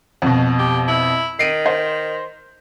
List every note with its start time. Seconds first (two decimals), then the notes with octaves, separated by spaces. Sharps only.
0.22 F2 B2
0.59 G4
0.88 E4
1.39 D#3 C7 D7 D#7
1.66 C5